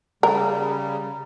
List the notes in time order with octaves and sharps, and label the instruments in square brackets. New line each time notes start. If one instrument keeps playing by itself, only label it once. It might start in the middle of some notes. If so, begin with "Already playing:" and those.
[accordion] C#3 G3 [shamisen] A#4 [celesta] A#5